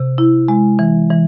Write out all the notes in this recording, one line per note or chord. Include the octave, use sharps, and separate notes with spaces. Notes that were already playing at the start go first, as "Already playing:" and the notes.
Already playing: C3
E4
G#3
E3
E3